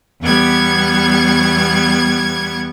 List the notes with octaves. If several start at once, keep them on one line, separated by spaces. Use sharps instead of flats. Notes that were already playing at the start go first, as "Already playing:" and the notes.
E2 G3 B3 C#6 G#6